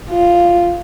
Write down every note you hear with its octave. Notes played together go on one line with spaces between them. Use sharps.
F4